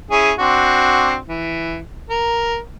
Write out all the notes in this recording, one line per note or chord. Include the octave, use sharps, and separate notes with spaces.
C#4 E4 G#4
C4 D4 F#4
E3
A#4